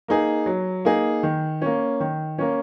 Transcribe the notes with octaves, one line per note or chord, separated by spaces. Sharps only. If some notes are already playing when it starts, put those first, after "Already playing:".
A#3 D#4 G#4
F#3
A#3 D#4 G#4
D#3
A#3 C#4
D#3
A#3 C#4